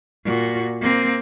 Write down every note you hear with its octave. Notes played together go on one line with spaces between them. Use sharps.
A#2 F#4
A#3 C4